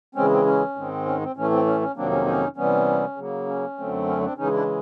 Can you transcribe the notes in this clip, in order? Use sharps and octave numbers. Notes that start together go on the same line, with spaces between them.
C#3 E3 G#3 C4 C#4
C4
C#4
G#2 D#3 G#3 C4
C#4
C4
A2 E3 A3 C#4
C4
C#4
C#4
F2 C3 D#3 F#3 A#3 C4 D4
C#4
C#4 D#4
C3 E3 G3 B3 C#4
C#3 F#3 A#3
C#4
F#2 D3 F#3 A3 C4
C#4
C4 D4
C#3 E3 G#3 C#4 D#4
D4 E4